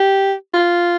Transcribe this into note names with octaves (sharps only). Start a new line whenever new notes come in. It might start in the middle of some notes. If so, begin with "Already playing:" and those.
Already playing: G4
F4